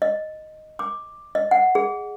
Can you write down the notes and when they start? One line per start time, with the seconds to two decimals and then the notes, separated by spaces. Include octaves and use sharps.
0.02 D#5
0.79 D6
1.35 D#5
1.51 F#5
1.75 G#4